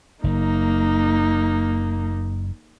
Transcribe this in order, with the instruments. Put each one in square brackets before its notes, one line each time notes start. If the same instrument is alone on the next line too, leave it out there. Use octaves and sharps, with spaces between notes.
[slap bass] F#1 [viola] A#3 D#4